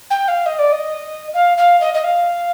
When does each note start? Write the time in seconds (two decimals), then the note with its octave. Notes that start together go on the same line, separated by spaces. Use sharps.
0.10 G5
0.28 F5
0.46 D#5
0.58 D5
0.72 D#5
1.33 F5
1.57 F5
1.80 D#5
1.94 D#5
2.04 F5